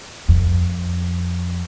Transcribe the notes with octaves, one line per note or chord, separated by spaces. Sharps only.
F2